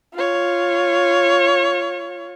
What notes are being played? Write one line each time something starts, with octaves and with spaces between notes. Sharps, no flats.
F4 C#5